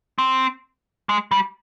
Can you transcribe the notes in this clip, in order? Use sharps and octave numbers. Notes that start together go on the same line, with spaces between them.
C4
G#3
G3